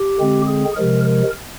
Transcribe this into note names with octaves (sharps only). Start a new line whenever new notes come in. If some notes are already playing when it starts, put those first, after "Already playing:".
Already playing: G4
D3 G#3 C4
G#4
C3 F3 G#3 A#4
A#4